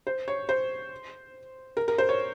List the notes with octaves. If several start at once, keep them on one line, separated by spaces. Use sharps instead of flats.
C5
C#5
C5
A#4
A#4
C5
C#5